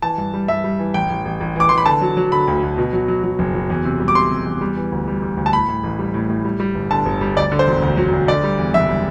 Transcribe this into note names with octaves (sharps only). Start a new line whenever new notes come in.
E3 A5
G2
G3
G2 E5
G3
E3
A1 G5
A1
A1
A1
E3 D6
E3 C6
B5
D3 A5
F#3
F#3
D3 B5
D2
D2
B2
F#3
F#3
F#3
F#1
F#3
E2
C3
G3
D6
C3 C6
C3
E2
G3
E3
D2
G3
G3
D2
A5
A2 B5
A2
A1
G3
A2
A2
G3
G3
G1
D3 A5
G1
G3
D2 D5
D3
C5
E1
D2
F#3
D2
D3 D5
G3
E2
F#1 E5
G3